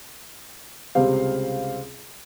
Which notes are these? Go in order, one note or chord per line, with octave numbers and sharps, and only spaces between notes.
C#2 C3 G3 C4 F5